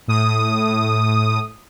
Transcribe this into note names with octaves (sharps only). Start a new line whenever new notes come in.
A2 D#6